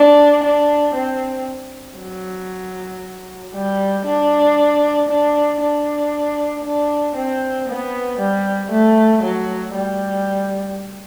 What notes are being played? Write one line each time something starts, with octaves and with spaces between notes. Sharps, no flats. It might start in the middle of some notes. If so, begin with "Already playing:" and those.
Already playing: D4
D4
C4
F#3
G3
D4
D4
D4
D4
C4
B3
G3
A3
F#3
G3